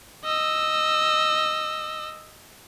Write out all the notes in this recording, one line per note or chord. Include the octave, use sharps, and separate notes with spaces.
D#5 E6